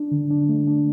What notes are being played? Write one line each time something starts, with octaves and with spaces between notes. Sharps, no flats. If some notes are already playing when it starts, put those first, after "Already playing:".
Already playing: D4
D3
D4
A3
D4